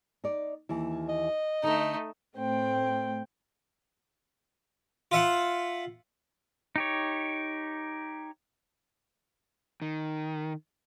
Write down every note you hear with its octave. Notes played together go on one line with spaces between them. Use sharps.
D#4 D5
D#2 E3 E4
D#5
D3 A3 D#4
A2 A3 C4 G5
F4 E5 F#5
D#4 G4 C#5
D#3